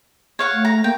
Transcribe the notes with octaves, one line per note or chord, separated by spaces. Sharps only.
C#5 F5 F#5
A3
A#5
A#3 G5